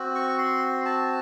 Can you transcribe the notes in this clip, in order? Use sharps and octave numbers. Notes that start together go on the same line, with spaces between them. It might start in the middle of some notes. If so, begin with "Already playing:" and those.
Already playing: C4 F#4
C#6
C6
A5